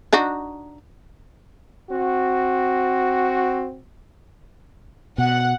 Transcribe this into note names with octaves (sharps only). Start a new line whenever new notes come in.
D4 D#4 F#4
C4 F#4
B2 F#5